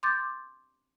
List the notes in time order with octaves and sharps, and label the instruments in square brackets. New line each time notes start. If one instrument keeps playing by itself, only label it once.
[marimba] C6 D6 G6 A6